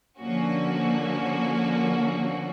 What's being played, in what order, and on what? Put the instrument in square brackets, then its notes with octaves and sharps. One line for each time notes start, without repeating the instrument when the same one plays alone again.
[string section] D3 F3 A#3 C#4 F#4